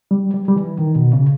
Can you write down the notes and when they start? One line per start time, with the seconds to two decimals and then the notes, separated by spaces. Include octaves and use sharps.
0.11 G3
0.34 G3
0.48 G3
0.56 E3
0.78 D#3
0.96 B2
1.13 C#3